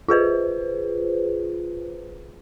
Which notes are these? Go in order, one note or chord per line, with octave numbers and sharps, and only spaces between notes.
F4 G#4 B4 C5